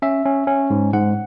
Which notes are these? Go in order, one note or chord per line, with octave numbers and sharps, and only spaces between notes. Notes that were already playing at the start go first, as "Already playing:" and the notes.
C#4 E5
C#4
C#4
G#2
G#2 F#5